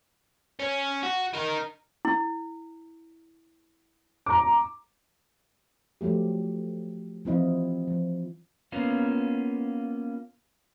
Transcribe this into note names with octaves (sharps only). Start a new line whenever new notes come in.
C#4
F#4
D#4 A#4
E4
A#5 D6
F3 F#3 A3 G4
E3 F3 C4 E4 D#5 F5
F3
A#3 B3 C#4 F4